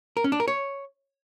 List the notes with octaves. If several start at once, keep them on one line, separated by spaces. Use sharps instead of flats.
A#4
C#4
D4
A#4
C#5